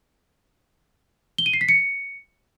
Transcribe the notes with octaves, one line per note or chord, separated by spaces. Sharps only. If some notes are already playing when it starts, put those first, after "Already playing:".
G7
D#7
C7
B6
C#7